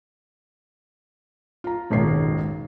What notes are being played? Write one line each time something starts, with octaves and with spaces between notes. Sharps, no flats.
F4 A#5
F#1 B1 G#2 D#3 C7